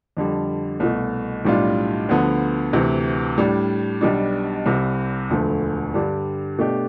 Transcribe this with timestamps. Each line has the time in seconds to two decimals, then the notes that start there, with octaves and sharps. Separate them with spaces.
0.17 F2 D3 G3
0.80 C2 B2 A3
1.45 B1 A2 G3 D4 F4
2.09 D2 D3 F3 B3
2.73 D2 C3 E3
3.38 A2 G3 D4
4.01 B1 B2 G3 D4
4.66 C2 C3 G3
5.29 E1 D2 D3 F3 A3
5.94 G2 D3 G3 D4 G4
6.58 B2 A3 D4 G4